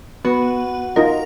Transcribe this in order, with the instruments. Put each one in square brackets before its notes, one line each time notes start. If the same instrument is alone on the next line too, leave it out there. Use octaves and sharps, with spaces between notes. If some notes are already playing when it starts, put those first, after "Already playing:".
[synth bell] B3 [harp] F#4
[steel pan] D#4 F4 D#5 [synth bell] A#4